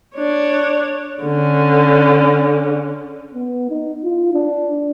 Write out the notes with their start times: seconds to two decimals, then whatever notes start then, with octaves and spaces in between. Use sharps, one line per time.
0.16 D4 C#5
1.23 D3 C#4
3.34 B3
3.69 D#4
4.04 F4
4.33 D4